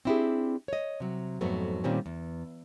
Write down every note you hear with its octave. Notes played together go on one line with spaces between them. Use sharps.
C4 D4 E4 F4 G4 G#4
C#5 D#5
C3 F#3
F2 G#2 F#3 A3 B3
A#2 D#3 G3 C4 C#4
E2